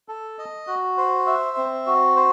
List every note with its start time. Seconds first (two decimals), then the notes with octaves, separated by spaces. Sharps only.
0.09 A4
0.39 D#5
0.67 F#4
0.97 C5
1.27 E5
1.57 C4
1.86 F#4
2.16 C5